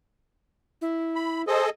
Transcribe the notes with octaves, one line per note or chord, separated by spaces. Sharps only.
E4
B5
G#4 A4 C5 D#5